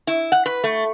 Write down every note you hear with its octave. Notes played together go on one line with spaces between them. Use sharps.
E4
F#5
B4
A3